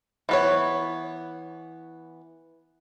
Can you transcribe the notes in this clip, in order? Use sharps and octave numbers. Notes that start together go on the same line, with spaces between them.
E3 B3 C#5